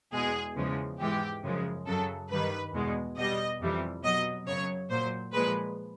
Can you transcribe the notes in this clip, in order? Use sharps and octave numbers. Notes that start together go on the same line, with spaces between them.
E2 B2 G#3 G#4
E2 C#3 F3 G#3
G#2 E3 G#3 G4
F#2 C#3 F3 G#3
F#2 C#3 F#3 A4
G2 D#3 G3 B4
E2 B2 G#3
B2 G3 D#5
F2 C3 E3 G3
B2 F#3 D#5
F#2 C#3 F#3 C#5
A#2 F#3 C5
A#2 F3 G#3 B4